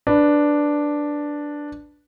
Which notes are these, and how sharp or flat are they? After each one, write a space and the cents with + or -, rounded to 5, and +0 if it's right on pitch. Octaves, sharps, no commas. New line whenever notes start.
D4 +0 B4 +0